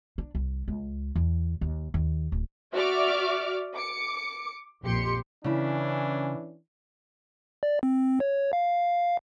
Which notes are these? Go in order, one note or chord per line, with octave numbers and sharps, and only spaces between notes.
D4
C2
C#2
E2
D#2
D#2
D1
F#4 D5 E5 C#6 D6 F6
D6 C#7
A#1 F2 G4 C6 C#7
C#3 E3 C#4 D4 E4
D5
C4
C#5
F5